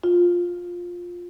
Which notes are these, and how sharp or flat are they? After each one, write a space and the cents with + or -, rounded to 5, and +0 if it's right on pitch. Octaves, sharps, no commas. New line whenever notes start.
F4 +10